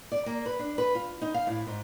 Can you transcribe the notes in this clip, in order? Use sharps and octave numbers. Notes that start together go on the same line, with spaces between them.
D5
A#3
B4
D4
B4
F4
D#4
F5
A2
G#2